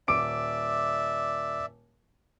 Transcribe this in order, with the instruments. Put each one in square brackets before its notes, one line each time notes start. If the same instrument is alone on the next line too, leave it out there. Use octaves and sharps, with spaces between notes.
[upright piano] D#1 D6 D7 [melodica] D5 E5